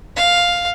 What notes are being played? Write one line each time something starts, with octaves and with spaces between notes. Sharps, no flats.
F5